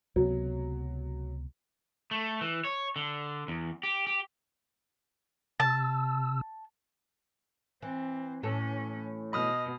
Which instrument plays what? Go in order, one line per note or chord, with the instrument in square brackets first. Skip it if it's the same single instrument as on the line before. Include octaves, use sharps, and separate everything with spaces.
[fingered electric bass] C#2 C3 B3 [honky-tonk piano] F#3
[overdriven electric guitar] A3
E3
C#5
D3
E2
G4
G4
[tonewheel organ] C3 E6 [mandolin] A5
[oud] E3 [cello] C4
[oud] A2 E3 A4 [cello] C#4
[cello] B2 [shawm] D#5 [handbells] B5 D#6 F6